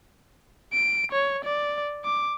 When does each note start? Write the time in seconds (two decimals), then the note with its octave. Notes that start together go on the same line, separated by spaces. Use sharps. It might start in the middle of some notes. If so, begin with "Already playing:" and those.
0.73 D7
1.12 C#5
1.45 D5
2.05 D6